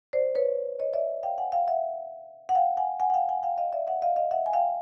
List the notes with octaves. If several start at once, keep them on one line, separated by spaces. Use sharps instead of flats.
C5 D5
B4 C#5
C#5 D#5
D5 E5
F5 G5
F#5 G#5
F5 G5
E5 F#5
F#5
F5 G5
F#5 G#5
F#5 G#5
F#5
F5 G5
F#5 G#5
F5 G5
D#5 F5
D5 E5
E5 F#5
D#5 F5
D#5 F5
E5 F#5
G#5
F5 G5